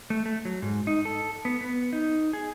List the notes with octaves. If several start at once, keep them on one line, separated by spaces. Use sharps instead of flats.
A3
A3
F#3
G#2
D#4
A4
B3
B3
D#4
G#4